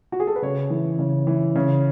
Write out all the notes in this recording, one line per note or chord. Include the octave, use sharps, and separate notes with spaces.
F#4
G#4
A4
B4
C#3 C#5
E3
C#3
E3
C#3